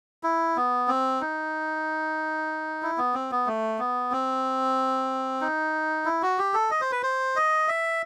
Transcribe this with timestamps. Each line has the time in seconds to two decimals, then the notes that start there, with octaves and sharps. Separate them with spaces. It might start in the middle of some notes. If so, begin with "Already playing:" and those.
0.23 E4
0.57 B3
0.88 C4
1.21 D#4
2.83 E4
2.98 B3
3.14 C4
3.32 B3
3.46 A3
3.79 B3
4.12 C4
5.41 D#4
6.05 E4
6.22 F#4
6.38 G4
6.54 A4
6.71 D#5
6.81 C5
6.92 B4
7.03 C5
7.36 D#5
7.68 E5